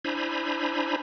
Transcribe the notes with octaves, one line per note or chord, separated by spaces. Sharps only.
D4 E4 C5 G#5 A#5 B5